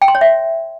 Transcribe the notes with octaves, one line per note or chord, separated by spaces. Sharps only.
G5
C6
C#5
E5